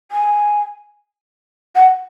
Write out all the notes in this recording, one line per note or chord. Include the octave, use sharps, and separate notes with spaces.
G#5
F#5